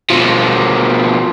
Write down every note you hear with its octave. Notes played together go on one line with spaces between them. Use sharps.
B2 F3